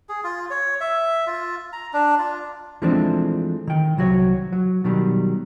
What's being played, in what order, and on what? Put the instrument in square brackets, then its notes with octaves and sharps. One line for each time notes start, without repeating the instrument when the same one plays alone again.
[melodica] G#4
F4
C#5
E5
F4
A#5
D4
F4
[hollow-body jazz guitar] E3 F3 G#3 A3 C4 D4
D#3 G5
C2 F#3 F#4 C#5
F#3
B2 D#3 F#3 G3